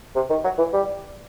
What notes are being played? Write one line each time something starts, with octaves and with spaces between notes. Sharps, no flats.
C3
D#3
F#3
E3
G3